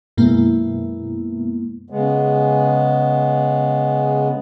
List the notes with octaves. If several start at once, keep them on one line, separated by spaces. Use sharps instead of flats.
F#2 B2 G#3 A#3 B3 E4
C#3 G#3 B3